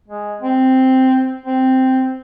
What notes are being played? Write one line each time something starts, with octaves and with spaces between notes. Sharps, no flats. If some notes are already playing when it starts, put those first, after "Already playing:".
G#3
C4
C4